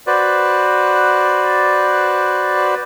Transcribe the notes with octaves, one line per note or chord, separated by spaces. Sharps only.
F#4 B4 C5 D5